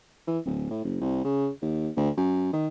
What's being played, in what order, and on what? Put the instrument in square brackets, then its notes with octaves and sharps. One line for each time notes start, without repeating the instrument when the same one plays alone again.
[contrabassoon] E3
D1
A2
F#1
C2
C#3
D#2
D2
F#2
D#3